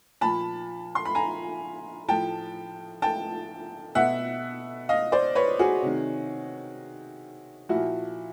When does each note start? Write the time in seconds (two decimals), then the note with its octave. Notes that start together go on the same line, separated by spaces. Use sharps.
0.21 A#2 F3 A5 B5
0.95 C6
1.05 B5
1.15 G#5 A#5
2.08 A2 F3 G5 A5
3.02 G5 A5
3.95 B2 E5 F#5
4.89 D#5 F5
5.12 C5 D5
5.35 B4 C#5
5.59 F#4 G#4
5.83 C3 D#3
7.69 A#2 F3 E4 F#4